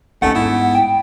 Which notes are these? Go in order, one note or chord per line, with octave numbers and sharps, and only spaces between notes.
G#1 D#2 A3 C#4 D#4 F#5
G#2 B3 E4
G5